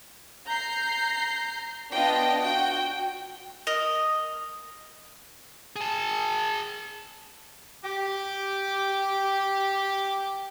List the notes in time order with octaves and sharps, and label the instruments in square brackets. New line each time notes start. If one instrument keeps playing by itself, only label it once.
[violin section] A#5 G6 C7
B3 D4 F4 D#5 G5
F#4 G5
[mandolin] A#4 D#5
[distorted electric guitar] G#4 A5
[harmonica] G4 G5 D6